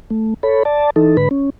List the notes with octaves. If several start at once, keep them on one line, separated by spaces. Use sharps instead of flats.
A3
A4 C#5 B5
D5 A5
E3 D#4 A4
G#2 D3 B4 B5
C#4